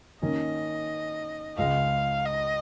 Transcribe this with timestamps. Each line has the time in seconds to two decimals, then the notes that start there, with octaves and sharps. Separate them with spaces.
0.22 D#3 A#3 C#4 D#5
1.57 C#2 C#3 G#3 F5
2.26 D#5